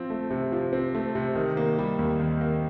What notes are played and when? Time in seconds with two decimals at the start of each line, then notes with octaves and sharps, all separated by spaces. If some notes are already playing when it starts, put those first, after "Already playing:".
Already playing: F3 C4
0.10 A3
0.30 C3
0.52 F3
0.73 C4
0.95 A3
1.15 C3
1.35 D#3
1.57 A#3
1.79 G3
1.99 D#2
2.20 D#3
2.41 A#3